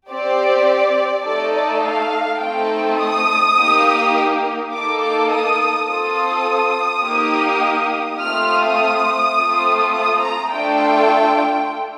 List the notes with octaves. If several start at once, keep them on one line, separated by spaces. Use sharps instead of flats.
C4 G4 D5
A3 D#4 A4 D5
D5
F5
A3 C4 D#4 A4 G5
D#6
A#3 D#4 G4
A#3 D#4 A4 D6
D6
D#6
C4 F4 A4 D#6
A#3 D#4 G4
A3 C4 F4 F6
D#6
A3 C4 F4 A4
D#6
A#5
A3 D4 F4 A4 G5